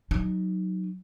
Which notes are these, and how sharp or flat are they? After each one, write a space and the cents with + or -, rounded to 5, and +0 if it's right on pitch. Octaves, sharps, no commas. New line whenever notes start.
F#3 +0 D#4 -5